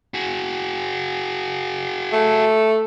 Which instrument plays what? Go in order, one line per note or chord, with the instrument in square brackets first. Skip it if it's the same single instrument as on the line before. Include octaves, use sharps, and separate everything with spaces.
[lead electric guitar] F#4 G#4
[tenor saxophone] A3